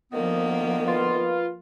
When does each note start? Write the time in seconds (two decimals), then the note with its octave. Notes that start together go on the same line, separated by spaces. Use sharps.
0.12 D2 D#3 F3 A#3 B3
0.88 F4 B4